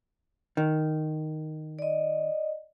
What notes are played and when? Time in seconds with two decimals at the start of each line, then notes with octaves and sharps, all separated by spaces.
0.57 D#3
1.79 D5 D#5